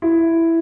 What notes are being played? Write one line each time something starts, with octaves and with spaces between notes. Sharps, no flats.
E4